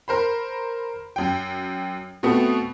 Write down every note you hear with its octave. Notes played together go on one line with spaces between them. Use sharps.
A#4 C5 B5
F#2 G5
B2 A3 B3 C4